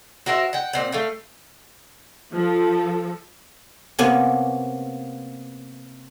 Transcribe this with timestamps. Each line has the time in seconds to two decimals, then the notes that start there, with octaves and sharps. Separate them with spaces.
0.26 F#4 A#4 C5 E5
0.53 F#5 G5
0.73 A#2 C4 F#5
0.92 A3 F5 G5
2.32 F3 F4 A4
3.99 C3 A#3 B3 C#4